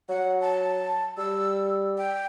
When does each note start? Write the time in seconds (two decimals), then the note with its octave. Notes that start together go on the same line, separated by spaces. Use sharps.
0.09 F#3 F#5
0.41 A5
1.18 G3 E6
1.98 G5